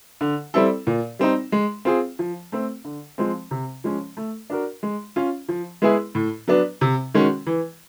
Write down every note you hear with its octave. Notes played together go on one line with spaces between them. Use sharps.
D3
G3 C4 E4 A4
A#2
G3 C4 D#4
G#3
C4 F4 G#4
F3
A3 C4
D3
F3 G#3 C4
C3
F3 G#3 C#4
A3
D4 F#4 A#4
G#3
C#4 F4
F3
G#3 B3 E4 G#4
A2
F#3 B3 D4
C3
D#3 G#3 C#4 F#4
E3